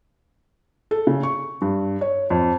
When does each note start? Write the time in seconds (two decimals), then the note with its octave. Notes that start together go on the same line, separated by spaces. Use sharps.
0.91 A4
1.07 C#3
1.23 C#6
1.61 G2
2.01 C#5
2.30 F2